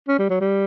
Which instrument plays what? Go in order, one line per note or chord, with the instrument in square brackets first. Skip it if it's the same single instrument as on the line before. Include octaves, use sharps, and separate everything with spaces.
[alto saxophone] C#4
G3
F#3
G3